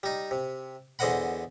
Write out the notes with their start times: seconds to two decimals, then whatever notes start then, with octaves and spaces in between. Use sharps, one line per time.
0.03 G3 D#4
0.31 C3
0.99 E2 D3 C5 D#5 F#5 B5